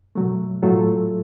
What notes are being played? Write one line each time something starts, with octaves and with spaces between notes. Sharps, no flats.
B2 F#3 A3
A2 F#3 A3 F4 A4